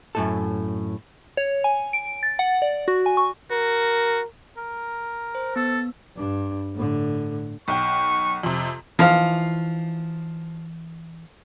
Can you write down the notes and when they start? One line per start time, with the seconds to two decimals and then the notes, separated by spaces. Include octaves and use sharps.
0.15 F#2 A2 A4
1.37 C#5
1.64 G#5
1.93 D7
2.23 A6
2.39 F#5
2.62 D5
2.88 F#4
3.06 G#5
3.17 C#6
3.51 F#4 A#4
4.57 A#4
5.35 C5
5.56 B3 A4 E6
6.17 G2 D4
6.75 A2 D3
7.68 B1 G5 C#6
8.43 F2 C3
8.99 E3 F3 D#4 F5 A#5